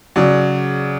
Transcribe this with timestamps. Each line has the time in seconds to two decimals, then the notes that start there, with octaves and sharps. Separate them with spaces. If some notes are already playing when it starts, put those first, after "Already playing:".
0.16 C#3 F#3 D5